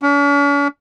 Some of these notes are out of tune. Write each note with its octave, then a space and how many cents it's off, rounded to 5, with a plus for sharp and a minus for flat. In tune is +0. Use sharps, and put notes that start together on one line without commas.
C#4 +45